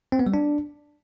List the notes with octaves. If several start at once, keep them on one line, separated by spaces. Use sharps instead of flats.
C4
B3
G3
D4